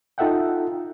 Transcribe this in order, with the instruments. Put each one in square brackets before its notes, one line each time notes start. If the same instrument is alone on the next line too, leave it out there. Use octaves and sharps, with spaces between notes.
[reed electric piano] D#4 F4 A4 E5 F#5 G5